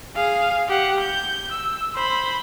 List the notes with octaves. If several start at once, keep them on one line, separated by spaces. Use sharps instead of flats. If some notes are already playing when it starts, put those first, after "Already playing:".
G#4 F5
G4 F#5
G6
E6
C5 B5